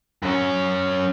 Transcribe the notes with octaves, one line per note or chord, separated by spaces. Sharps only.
F#2 C#4